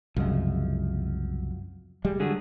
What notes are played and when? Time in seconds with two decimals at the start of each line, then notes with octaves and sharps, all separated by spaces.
0.16 C2 F#2 C#3 F3 G#3
2.05 G3 G#3
2.20 D3 F#3 G#4